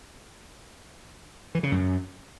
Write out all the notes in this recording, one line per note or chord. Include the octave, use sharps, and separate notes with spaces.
E3
C#3
F#2